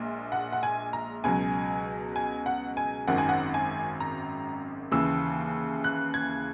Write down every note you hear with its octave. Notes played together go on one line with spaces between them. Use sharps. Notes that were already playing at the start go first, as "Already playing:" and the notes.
Already playing: A#1 A#2 G#3
F#5
F#5
G#5
A#5
C#2 B2 F#3 G#5
G#5
F#5
G#5
G#1 F#2 D#3 F#5
G#5
F#5
G#5
A#5
D#2 C#3 E3 E6
F#6
G#6